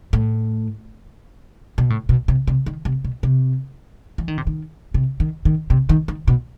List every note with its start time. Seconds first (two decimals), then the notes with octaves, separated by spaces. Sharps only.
0.13 A2
1.78 B2
1.90 A2
2.09 B2
2.28 C3
2.47 C3
2.66 D#3
2.85 C3
3.04 B2
3.23 C3
4.18 E3
4.28 D#3
4.38 C3
4.47 D#3
4.94 C3
5.20 D#3
5.45 D#3
5.70 C3
5.89 D#3
6.08 D#3
6.28 B2